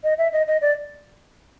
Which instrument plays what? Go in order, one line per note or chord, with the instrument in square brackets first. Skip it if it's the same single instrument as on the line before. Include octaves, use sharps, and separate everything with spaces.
[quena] D#5
E5
D#5
D#5
D5